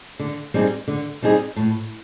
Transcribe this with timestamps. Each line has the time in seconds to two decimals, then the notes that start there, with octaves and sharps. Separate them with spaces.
0.20 D3
0.54 G3 C4 D#4 G#4
0.88 D3
1.22 G3 C4 D#4 G#4
1.56 A2